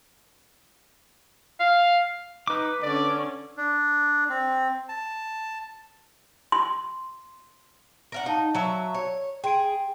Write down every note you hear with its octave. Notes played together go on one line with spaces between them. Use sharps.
F5
D#4 B4 D6
D3 C#4 D5
D4
C4
A5
C6
A#4 F5 F#5
D#4 F5 A5
F#3 E5
C#5
G#4 G5 C6 D7